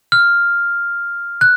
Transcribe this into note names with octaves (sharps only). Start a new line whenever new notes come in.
F6
F#6